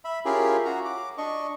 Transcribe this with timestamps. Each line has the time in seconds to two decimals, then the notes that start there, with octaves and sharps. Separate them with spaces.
0.05 E5 B5
0.25 C#4 E4 F4 G4 G#4 A#4
0.65 F#4 A#5
0.85 D6
1.18 D4 D#5 C#6